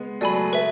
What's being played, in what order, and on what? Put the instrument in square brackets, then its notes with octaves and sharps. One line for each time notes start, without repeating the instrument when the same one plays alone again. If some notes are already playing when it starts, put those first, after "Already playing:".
Already playing: [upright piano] G#3 B3
[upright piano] F#3 A3 [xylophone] D5 G#5 B5
[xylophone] B4 E5